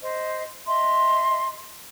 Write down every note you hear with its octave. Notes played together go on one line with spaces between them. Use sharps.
C5 D#5
D#5 E5 C6